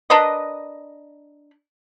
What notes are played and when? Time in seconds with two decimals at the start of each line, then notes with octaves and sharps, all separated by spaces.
0.10 D4 A#4 B4 D#5